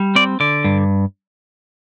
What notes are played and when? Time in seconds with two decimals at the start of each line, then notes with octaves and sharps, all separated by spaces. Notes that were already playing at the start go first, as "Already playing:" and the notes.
Already playing: G3
0.15 C4 D5
0.40 D3 D5
0.64 G2